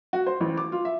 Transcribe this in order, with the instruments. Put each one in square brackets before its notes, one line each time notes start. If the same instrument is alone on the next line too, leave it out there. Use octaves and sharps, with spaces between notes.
[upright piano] F#4
C5
A1
D6
F4
E5